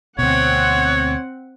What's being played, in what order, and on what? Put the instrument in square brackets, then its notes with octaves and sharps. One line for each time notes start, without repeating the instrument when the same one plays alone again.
[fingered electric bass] D2 B2 [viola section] C4 F#5 [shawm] C#5